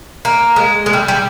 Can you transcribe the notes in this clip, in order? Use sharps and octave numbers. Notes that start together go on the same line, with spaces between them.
A#3
G#3
G#3
G3
G3